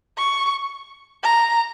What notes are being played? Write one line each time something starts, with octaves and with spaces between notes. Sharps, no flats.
C#6
A#5